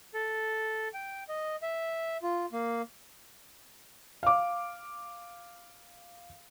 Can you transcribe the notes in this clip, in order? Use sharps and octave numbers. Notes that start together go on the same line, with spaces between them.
A4
G5
D#5
E5
F4
A#3
F5 D6